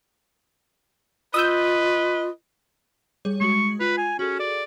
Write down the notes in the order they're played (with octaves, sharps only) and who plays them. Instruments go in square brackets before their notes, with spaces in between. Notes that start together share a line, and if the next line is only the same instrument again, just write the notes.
[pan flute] F4 [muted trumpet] B4 [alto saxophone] D#5 [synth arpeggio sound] D#6 E6 G6
[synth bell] G3 G#4 C#5
[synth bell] G#3 F#4 [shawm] C#6
[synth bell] F4 [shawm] B4
[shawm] G#5
[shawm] C#4 [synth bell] F#4 G#4 A4
[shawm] D5